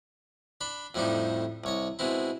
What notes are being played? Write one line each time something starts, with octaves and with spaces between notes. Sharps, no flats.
D4 B5
F2 A2 F3 G3 D4 D#4
C2 C#5 D#5
B2 G#3 C4 E4